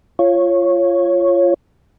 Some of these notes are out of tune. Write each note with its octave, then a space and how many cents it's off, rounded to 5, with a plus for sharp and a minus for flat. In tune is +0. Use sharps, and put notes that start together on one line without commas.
F4 -15 C#5 -10